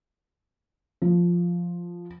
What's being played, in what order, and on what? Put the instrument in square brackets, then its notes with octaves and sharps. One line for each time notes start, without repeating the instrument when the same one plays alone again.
[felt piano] F3